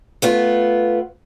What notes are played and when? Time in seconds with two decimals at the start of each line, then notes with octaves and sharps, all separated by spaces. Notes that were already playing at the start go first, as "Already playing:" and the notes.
0.22 A3 B3 F4